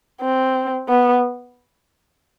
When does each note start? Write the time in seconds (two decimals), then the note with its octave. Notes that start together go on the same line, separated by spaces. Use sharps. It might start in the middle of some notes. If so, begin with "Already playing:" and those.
0.22 C4
0.89 B3